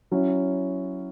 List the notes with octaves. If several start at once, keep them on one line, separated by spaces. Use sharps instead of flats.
F#3 C#4 E4